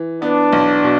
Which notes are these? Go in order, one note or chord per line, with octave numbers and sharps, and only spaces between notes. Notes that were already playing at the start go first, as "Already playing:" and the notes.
Already playing: E3
B3 D4
B1
B2